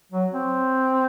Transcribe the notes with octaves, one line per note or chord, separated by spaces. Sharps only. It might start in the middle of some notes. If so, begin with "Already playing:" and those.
F#3
C4